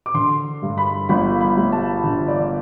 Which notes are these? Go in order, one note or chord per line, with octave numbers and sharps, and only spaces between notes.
D6
D3 C6
G2
B5
G1 B5
B5
G3
A5
D3
D5